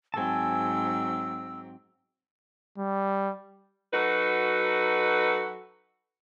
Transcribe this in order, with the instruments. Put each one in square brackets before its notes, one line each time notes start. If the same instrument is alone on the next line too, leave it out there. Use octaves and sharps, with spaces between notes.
[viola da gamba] G#2 F#3 C4 [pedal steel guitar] G#5 A5 [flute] E6
[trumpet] G3
[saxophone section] F#3 D#4 F#4 A4 B4